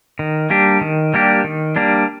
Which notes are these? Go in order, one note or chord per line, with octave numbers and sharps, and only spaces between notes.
D#3
G3 A#3 D4 G4
D#3
G3 A#3 D4 G4
D#3
G3 A#3 D4 G4